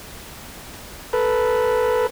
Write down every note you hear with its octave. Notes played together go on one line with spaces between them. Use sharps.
A4 B4